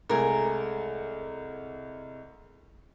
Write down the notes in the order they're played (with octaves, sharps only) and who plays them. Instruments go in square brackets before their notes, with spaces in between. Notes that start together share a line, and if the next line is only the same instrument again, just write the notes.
[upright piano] C2 G#3 A3 [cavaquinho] A#4 G#5